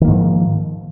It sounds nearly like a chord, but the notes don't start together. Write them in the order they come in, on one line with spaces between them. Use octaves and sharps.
D#3 A#3 G#2 F3